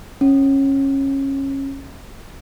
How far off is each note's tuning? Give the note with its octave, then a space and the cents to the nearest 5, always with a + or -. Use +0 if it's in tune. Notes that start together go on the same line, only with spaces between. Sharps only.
C#4 -20